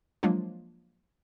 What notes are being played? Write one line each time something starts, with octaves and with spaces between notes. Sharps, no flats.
F3 F#3 G#3 A#3 D4 F4